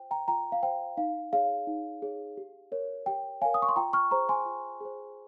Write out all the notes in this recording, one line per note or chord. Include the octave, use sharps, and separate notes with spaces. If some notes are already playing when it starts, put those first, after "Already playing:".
Already playing: F4 C5 G5
G5 A#5
F4 G5 A#5
F5
C5 G5
D#4 F5
G#4 C#5 F5
D#4
G#4 C#5
G4
A#4 C#5
G4 G5
A#4 C#5 F5 G#5
D#6
C#6
C6
F4 G5 A#5
C#6 F6
G#4 C5 A#5 C#6
G#5 C6
F4
G#4 C5